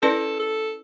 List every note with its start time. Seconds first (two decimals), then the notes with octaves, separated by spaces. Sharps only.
0.02 C#4 E4 A4 B4 D5
0.39 A4